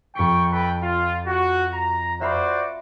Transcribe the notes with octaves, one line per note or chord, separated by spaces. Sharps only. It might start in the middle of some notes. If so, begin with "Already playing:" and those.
F2 G5 C#6 B6 C#7
A4 B4 G5
F4
F#4
A#5
F#4 C5 D5 E5 F5 B5